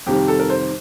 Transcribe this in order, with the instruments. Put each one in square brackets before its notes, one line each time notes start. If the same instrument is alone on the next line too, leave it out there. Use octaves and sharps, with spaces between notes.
[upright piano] F2 C3 D#3 G3 C4 G4
A4
A#4
C5